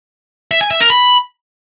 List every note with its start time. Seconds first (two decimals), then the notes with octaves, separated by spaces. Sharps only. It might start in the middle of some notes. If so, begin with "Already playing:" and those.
0.51 E5
0.61 G#5
0.71 E5
0.80 A#4
0.90 B5